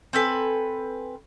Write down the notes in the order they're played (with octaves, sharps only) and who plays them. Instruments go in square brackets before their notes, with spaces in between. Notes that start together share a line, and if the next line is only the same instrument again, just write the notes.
[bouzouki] C4 A4 B4 G#5